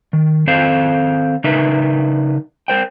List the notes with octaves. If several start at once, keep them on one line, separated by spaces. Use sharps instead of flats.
D#3
D#3 C4 A4 C5 F5
C#3 D#4 A#4 B4 E5
A#4 C5 G5